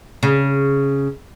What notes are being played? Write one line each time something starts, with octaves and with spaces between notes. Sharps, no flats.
C#3